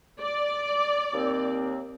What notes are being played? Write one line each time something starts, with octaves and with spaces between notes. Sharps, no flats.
D5
D#2 C4